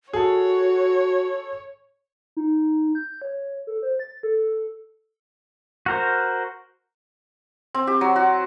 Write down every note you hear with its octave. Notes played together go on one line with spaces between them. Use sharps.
F#4 G#4 A4 C#5
D#4
G6
C#5
A4
C5
A6
A4
F#4 A#4 C5
C4
G4
F#3
F#4